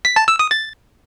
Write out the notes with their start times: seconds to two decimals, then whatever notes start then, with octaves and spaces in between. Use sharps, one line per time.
0.05 B6
0.16 A5
0.28 E6
0.39 D#6
0.51 A6